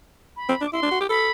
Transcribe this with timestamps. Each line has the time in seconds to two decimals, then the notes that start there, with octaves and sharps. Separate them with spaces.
0.37 B5
0.49 C4
0.61 D4
0.65 D6
0.73 E4 C6
0.82 D4
0.91 F#4
1.01 G4
1.09 A4 B5